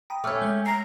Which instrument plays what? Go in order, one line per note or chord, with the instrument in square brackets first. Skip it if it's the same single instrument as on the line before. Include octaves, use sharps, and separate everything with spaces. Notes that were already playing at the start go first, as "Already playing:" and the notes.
[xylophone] G5 [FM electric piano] A#5 B5 D#6
[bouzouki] A3 C#4 [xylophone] D6 E6 F6
[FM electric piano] G#3 C#5 G6
[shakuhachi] A#5 [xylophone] C7